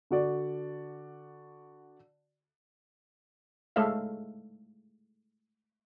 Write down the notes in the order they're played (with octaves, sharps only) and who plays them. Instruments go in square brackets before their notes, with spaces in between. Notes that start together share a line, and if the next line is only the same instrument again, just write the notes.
[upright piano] D3 F#4 D5
[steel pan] G#3 A3 A4 C#5 E5 F5